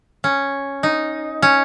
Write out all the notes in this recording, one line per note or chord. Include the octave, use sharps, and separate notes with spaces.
C#4
D#4
C#4